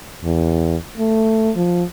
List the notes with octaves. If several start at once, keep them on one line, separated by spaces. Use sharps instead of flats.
E2
A3
F3